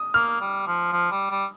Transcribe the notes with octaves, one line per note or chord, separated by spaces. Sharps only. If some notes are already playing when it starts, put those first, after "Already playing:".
Already playing: D#6
A#3 F6
G3
F3
F3
G3
G3